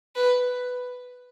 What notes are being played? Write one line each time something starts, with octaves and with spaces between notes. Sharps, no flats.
B4